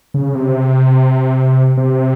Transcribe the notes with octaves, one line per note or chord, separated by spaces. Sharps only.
C#3
C3
C3